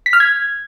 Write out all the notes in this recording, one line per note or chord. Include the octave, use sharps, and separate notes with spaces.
B6
F6
G#6